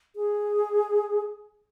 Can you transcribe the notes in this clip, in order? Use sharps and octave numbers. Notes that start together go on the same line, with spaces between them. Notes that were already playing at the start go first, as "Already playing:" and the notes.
G#4